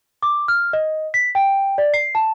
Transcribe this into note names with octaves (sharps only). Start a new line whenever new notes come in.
D6
F6
D#5
B6
G5
D5
C7
A5